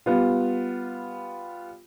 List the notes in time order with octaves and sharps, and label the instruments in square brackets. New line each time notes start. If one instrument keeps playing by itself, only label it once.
[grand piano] G3 B3 F4